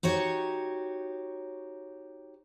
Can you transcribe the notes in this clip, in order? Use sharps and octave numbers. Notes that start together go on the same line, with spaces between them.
D#4 F#4 G4 C#5